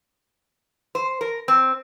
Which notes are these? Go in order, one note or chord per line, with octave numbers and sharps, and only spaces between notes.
C5
A#4
C4